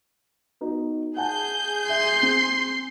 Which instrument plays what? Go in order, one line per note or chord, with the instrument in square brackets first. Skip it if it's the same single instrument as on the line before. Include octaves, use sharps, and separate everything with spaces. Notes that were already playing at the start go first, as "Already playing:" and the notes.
[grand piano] B3 D#4 F#4
[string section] G#4 G6 [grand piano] F#5 G#5 A5
[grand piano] E5 [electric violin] C6
[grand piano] C4